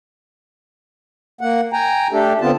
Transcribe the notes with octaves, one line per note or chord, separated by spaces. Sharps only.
A#3 F#5
G5 G#5 A#5
A3 D4 G4 A4
D3 B3 C4 F4 A5